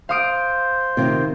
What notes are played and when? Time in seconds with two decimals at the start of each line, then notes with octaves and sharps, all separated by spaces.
0.09 C5 F5 D#6 D7
0.97 C3 D#3 F4